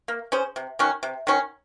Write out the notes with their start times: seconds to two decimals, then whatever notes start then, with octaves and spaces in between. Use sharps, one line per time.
0.08 A#3
0.32 C#4 G#4 C5
0.56 C3
0.79 D#3 F#3 C#4
1.03 C3
1.27 D#3 F#3 C#4